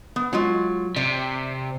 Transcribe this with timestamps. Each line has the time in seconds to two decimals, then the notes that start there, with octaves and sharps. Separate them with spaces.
0.16 B3
0.33 F#3 G#3 F4
0.96 C3 D5